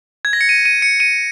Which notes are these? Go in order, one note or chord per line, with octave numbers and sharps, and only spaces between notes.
G#6
A#6
C#7
D#7
D#7
C#7
D#7